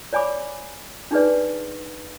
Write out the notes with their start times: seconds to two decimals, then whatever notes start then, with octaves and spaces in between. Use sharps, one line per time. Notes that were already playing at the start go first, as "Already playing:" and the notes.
0.13 C#5 D5 G#5 B5 D6
1.11 D4 D#4 G#4 B4 D5